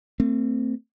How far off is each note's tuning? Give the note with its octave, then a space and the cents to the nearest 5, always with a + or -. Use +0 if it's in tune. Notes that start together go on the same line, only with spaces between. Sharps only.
A3 +40 C4 +0